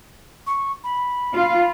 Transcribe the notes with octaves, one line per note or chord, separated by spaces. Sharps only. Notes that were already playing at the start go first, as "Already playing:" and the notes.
C#6
B5
F4